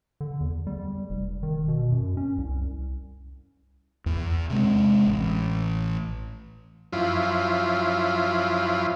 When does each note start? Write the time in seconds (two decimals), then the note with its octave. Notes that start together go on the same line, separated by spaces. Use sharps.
0.21 D3
0.41 E2
0.67 G3
1.10 F1
1.43 D#3
1.68 B2
1.92 F#2
2.17 C#4
2.38 C2
4.06 E2
4.50 C3 G#3
5.06 A1
6.93 F#2 F3 E4 F4